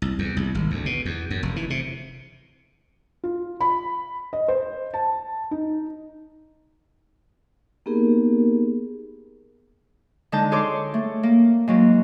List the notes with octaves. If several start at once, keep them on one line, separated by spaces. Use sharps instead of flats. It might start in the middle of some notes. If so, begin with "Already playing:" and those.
C2
E2
C2
G#1
D2
B2
E2
F#2
F1
E3
C3
F4
B5
D#5
C5
A5
D#4
A#3 B3 D#4 G4 G#4 A#4
D3 G#3 D#4 A5 G6
G#4 A4 C#5 C6 D6
A3
A#3
G#2 F#3 A#3